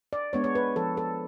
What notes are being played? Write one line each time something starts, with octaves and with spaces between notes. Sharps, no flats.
D5
G#3 B3 D4 C#5
C#5
B4
F3 A4
A4